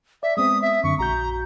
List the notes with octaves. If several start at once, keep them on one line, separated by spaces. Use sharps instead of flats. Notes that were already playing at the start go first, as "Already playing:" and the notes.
D5 E5
G#3 B3 C4 D#6
E5
F#2 D3 C#6
A#1 F#4 A#5 G6